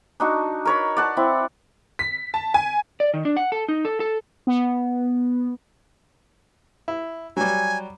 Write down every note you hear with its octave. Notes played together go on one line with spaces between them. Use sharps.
D4 D#4 F#4
A#4 C#5 B5
D5 F#5 A5
C4 E4
B6
A5
G#5
D5
D#3
D4
F#5
A4
D#4
A4
A4
B3
E4
F#3 G3 G#5